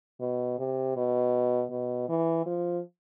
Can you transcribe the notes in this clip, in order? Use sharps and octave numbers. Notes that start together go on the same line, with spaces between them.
B2
C3
B2
B2
E3
F3